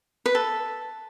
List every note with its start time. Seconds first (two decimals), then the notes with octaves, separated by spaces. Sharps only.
0.26 B4
0.35 A4